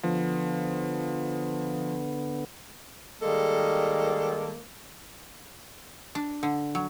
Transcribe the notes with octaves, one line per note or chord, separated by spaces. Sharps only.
D3 F3 B3
D#3 G3 G#3 A#3 A4
D4
D3
F#3